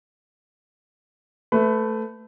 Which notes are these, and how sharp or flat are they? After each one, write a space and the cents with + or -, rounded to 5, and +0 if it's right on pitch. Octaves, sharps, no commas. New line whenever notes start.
A3 +0 B4 +20